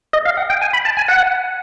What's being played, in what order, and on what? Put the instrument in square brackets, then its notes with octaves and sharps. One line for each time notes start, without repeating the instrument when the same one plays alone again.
[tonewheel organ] D#5
F5
F#5
G5
G#5
B5
A5
G#5
F#5